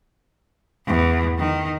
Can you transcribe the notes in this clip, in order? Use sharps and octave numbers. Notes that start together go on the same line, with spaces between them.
E2
D#3